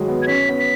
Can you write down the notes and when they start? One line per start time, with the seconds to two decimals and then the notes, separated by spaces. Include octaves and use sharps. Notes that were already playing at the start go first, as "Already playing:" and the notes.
Already playing: D#3 F#3 G#3
0.08 B3
0.22 G#6
0.27 C#4 B6
0.49 B3
0.59 B6